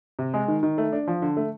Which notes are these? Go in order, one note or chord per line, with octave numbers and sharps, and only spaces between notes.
C3
G#3
D#3
D#3
A3
D4
F3
D3
A3